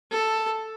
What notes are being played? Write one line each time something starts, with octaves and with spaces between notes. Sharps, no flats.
A4